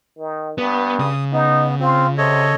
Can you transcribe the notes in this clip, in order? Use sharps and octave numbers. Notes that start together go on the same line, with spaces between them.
D#3
G2 B3
C#3 D#6
B3 D#4
C4 F4
C3 A4 C#5 D#5